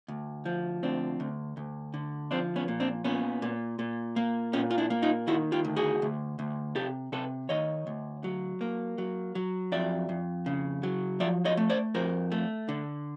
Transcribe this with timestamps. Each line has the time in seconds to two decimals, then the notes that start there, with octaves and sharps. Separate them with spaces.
0.08 D2
0.45 F3
0.83 D2 C4 D4
1.20 D2
1.57 D2
1.94 D3
2.31 F3 C4 D4
2.56 B3 C#4
2.68 A#2
2.80 C4 D4
3.04 A#2 B3 C#4
3.42 A#2
3.79 A#2
4.16 A#3
4.53 A#2 B3 C#4
4.70 F4
4.78 D4 E4
4.90 A#3
5.02 D#4 F4
5.27 D#3 E4 F#4
5.52 F4 G4
5.65 D2
5.76 F#4 G#4
6.02 D2
6.39 D2
6.75 C3 G4 A4
7.12 C3 A4 B4
7.49 D#3 C#5 D#5
7.87 D2
8.24 F#3
8.61 A#3
8.98 F#3
9.35 F#3
9.72 F2 D5 E5
10.09 F2
10.46 C#3
10.83 F#3
11.20 F3 D5 E5
11.45 C#5 D#5
11.57 A3
11.70 C5 D5
11.95 F2 A#4 C5
12.32 A3
12.69 D3